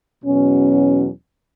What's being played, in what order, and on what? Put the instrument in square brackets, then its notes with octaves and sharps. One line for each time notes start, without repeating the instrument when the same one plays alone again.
[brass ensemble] E2 B2 F#3 C#4